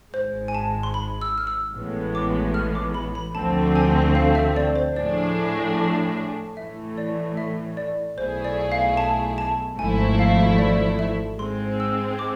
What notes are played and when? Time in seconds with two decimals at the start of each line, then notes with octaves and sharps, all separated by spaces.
0.13 G#1 G#2 G#3 C5
0.48 G#5
0.54 A5
0.83 C6
0.94 B5
1.21 E6
1.38 F6
1.47 E6
1.74 A1 A2 E3 G#3 B3
2.15 D6
2.54 F6
2.75 D6
2.94 B5
3.15 B5
3.35 D2 D3 F3 A3 C4 A5
3.76 G#5
4.15 F5
4.35 E5
4.56 D5
4.76 C5
4.96 A2 F3 A3 D4 G#4 D5
6.56 A2 E3 A3 E5
6.98 D5
7.37 E5
7.77 D5
8.18 B1 B2 A3 E4 G#4 C5
8.45 D5
8.72 F5
8.97 A5
9.38 A5
9.78 G#1 G#2 F3 A3 E4 G#5
10.19 F5
10.58 D5
10.99 E5
11.39 G#2 G#3 C4 C6
11.80 E6
12.19 D6